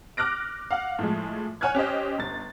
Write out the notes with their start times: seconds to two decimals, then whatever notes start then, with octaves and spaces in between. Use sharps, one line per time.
0.17 D6 F6 F#6 A#6 D7
0.71 F5 F#5 F6
0.99 A2 F3 G#3
1.61 C#5 F#5 G#5 F6 F#6 G#6
1.75 C#4 G4 C5 D#5
2.18 G1 A6